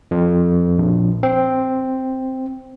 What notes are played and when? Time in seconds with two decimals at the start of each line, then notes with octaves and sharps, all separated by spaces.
0.11 F2
0.78 A#1
1.23 C4